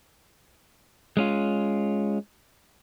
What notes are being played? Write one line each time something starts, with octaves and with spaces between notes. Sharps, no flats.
G#3 C#4 F4